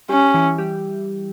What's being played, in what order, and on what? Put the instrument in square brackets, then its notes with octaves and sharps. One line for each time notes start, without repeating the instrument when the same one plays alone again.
[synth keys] G3 G4 [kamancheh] C#4
[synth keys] E3 E4
G3 G4